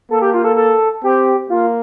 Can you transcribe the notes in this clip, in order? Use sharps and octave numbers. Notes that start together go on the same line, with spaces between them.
A#3 A4
G4
F4
A4
A4
C4 G4
A#3 F4